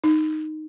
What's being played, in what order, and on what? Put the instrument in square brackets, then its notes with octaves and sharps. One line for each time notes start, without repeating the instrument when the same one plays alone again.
[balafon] D#4